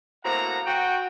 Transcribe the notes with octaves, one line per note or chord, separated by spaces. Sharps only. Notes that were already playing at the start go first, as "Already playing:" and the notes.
A2 A#3 C4 F#4 F#5 A#5
F#4 G5